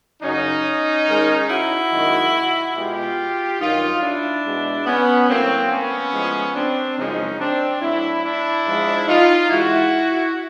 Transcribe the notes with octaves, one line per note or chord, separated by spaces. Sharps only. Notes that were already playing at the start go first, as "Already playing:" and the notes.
F#2 C#3 F#3 C#4 D#4
G#2 D#3 G#3
E4 F#4
F#2 D#3 G#3
B2 G#3 F4 G4
G2 D#3 F#3 D#4 F4
D4 E4
B2 G#3
B3 C#4
A2 F#3 A#3 C4
B3 C#4
A2 F3 G#3
C4 D4
F#2 C#3 F3 G#3 C#4 D#4
C4 D4
A2 F#3 D4 E4
D4 E4
G#2 F3 G#3
D#4 F4
G#2 E3 G#3 E4 F#4